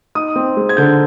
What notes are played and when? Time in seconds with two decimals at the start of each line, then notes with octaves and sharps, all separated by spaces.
0.15 D#4 D#6
0.36 C4
0.57 G#3
0.69 G#6
0.77 D3 G6